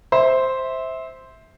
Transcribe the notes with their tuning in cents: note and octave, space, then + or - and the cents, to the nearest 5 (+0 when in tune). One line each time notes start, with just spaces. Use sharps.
C5 +0 E5 -20